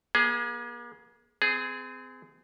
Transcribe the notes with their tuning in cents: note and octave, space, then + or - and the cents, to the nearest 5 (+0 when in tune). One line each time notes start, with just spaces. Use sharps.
A#3 +45 G#4 +0
C4 -35 G#4 +0